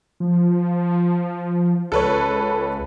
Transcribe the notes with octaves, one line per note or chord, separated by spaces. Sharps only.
F3
C#2 A4 B4 C#5